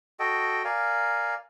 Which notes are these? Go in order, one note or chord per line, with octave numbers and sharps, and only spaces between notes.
F#4 A4 D#5 G5
A#4 D5 F5 G#5